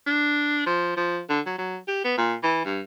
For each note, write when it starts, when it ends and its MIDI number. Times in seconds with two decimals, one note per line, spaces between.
0.06 0.61 62
0.66 0.92 53
0.97 1.20 53
1.29 1.40 50
1.46 1.56 54
1.58 1.77 54
1.88 1.99 67
2.04 2.15 59
2.18 2.34 46
2.43 2.64 52
2.65 2.81 43